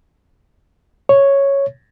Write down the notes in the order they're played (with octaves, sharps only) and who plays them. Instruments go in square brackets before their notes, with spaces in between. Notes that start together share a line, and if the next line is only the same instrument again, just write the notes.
[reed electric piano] C#5